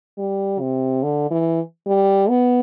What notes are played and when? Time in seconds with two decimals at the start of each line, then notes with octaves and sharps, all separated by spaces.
0.18 G3
0.60 C3
1.03 D3
1.31 E3
1.87 G3
2.29 B3